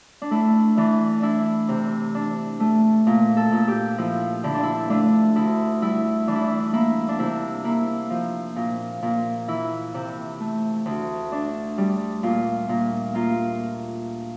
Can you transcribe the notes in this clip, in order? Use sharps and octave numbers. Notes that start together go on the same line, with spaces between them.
D4
A3 E4
E3 D4
D4 E4
C3
D4
A3
A#2
A4
A#2
G4
F3 E4
D3 E4
D4
E4
A3 D4
D2 E4
G3 E4
E3 D4
E4
D4
A#3 E4
D4
C3 E4
A#3 E4
F3
A#2
A#2
E3 E4
C3
A3
D2
D4
G3
A#2 F4
A#2
A#3 F4